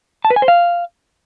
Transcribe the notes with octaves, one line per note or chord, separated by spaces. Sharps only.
A5
B4
G#5
C5
F5